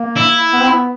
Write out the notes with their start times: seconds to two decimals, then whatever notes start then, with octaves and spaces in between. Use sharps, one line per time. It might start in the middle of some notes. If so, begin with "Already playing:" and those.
Already playing: A#3
0.17 E4
0.53 B3
0.61 C4
0.68 B3